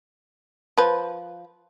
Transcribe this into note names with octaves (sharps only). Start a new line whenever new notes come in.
F3 B4